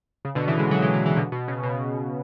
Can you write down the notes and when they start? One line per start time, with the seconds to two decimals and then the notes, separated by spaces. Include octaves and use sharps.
0.25 C#3
0.35 B2 D3
0.47 C#3 E3
0.59 E3 G#3
0.71 D3 F#3
0.82 E3 G#3
0.94 E3 G#3
1.06 C#3 E3
1.17 B2 D3
1.32 B2
1.48 C#3
1.63 B2